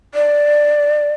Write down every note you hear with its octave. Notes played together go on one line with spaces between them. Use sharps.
D5